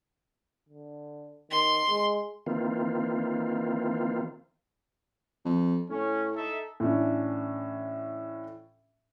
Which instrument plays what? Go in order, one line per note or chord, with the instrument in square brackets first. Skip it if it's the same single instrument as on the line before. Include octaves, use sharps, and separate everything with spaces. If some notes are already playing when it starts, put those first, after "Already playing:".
[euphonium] D3
[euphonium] D#3 [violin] C6
[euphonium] G#3
[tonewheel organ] D#3 E3 A#3 C4 F4
[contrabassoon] F2
[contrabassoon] A2 [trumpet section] C#4
[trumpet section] D#4 A4 E5
[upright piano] A2 E3 C#4 D4